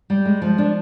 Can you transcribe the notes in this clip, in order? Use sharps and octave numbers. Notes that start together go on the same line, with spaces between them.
G3
G#3
F3
D4